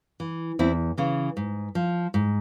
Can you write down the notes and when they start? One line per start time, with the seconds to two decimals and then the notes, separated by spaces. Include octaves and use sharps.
0.20 E3
0.59 E2 C4 E4
0.98 C#3 E3
1.37 G#2
1.75 F3
2.14 G#2